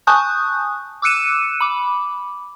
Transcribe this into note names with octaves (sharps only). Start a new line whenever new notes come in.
G#5 A5 C#6 D#6 F#6 G6
D6 E6 F#6 C#7 D#7 E7
B5 D6